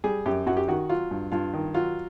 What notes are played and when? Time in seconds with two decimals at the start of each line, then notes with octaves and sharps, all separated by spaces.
0.04 G3 G#4
0.26 F#2 G4
0.46 F#2 F#4
0.57 G4
0.68 D#3 F#4
0.89 F#3 F4
1.11 G2
1.32 G2 F4
1.53 D#3
1.74 F#3 F4